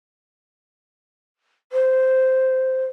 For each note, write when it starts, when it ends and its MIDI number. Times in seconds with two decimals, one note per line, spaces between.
1.72 2.85 72